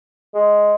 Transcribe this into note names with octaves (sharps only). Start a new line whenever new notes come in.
G#3